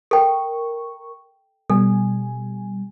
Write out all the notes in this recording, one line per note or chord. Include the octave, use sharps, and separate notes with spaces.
A4 A#4 G5 C#6
B2 G3 A4 G#5